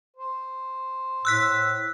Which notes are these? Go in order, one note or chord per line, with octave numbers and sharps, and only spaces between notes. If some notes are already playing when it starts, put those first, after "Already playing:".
C5
A2 E6 F#6 B6